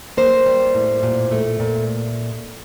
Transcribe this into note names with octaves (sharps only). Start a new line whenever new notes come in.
A#3 C5
G3
A2
A#2
A3
A#2